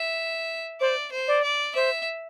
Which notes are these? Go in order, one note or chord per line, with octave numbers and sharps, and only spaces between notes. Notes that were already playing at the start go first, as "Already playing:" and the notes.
Already playing: E5
C5 D5
C5
D5
D5
C5 E5